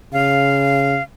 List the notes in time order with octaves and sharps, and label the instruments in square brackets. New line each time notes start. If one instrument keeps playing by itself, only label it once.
[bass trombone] C#3 [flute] F5